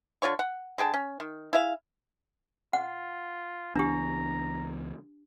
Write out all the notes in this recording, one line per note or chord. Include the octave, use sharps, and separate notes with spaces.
D3 F4 C#5 C#6
F#5
D3 G#4 G5 A5
C#4
D#3
E4 G#4 E5 F5
F4 F#5
C#2 E3 B3 D4 G4 A#5